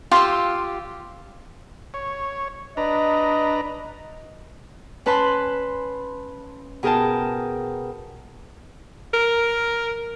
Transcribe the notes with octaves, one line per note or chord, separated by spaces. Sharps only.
F4 G4 F5 C6 E6
C#5
D4 B4 D#5 A#5
C#4 B4 A5 B5 C6
B2 G#4 A#4 G5 A5
A#4